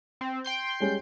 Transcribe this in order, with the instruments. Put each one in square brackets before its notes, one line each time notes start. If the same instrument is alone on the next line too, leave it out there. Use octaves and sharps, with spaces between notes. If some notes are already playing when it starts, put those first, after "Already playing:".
[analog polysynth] C4
G5 C6 G6
[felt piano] G3 G#3 C#4